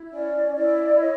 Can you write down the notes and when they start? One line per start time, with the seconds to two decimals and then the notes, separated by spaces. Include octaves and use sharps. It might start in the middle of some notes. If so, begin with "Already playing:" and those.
Already playing: E4
0.11 C#4 D5
0.56 E4 D5
0.95 E5
1.00 C#5 D#5